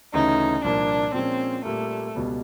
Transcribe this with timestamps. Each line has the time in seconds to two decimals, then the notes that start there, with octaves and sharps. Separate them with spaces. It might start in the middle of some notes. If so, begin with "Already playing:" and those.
0.14 D2 C#3 E3 A3 C#4 D#4
0.64 C2 A#2 F3 A#3 D4
1.14 A#2 F3 G#3 C4 C#4
1.65 A#2 G3 A3 A#3
2.15 C#2 B2 G3 B3